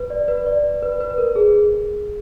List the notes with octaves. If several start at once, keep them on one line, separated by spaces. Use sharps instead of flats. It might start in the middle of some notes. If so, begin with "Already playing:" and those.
Already playing: B4
D5
B4
D5
B4
B4
B4
A#4
G#4